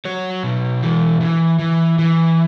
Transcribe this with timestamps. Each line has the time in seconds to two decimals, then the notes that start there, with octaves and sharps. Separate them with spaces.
0.05 F#3 C#5
0.43 B2
0.82 E3
1.21 E3
1.59 E3
1.99 E3